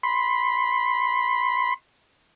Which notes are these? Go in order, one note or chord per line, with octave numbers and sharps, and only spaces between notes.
B5 C6